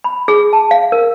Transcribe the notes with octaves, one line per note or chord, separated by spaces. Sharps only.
B5
G#4
A5
F5
A#4